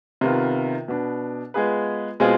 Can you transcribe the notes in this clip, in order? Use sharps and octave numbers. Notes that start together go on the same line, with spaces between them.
C3 D#3 B3 F4
B2 B3 D4
G#3 B3 F4 G#4 B4
B2 G#3 C4 F4 G#4